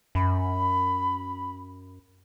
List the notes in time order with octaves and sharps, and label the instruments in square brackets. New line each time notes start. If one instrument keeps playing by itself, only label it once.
[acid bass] F#2 [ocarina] B5